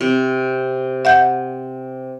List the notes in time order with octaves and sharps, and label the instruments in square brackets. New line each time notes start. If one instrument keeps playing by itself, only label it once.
[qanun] C3
[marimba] E5 F#5 G6